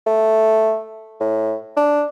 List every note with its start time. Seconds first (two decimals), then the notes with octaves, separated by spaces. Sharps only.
0.06 A3
1.20 A2
1.77 D4